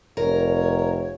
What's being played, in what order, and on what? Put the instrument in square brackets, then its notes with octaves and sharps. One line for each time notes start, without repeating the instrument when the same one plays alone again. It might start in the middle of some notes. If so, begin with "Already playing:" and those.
[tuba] F1 [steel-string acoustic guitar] A#4 [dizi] C#5